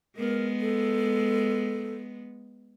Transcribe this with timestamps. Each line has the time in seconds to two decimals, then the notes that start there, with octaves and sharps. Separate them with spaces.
0.17 G#3 B3 A#4
0.60 A4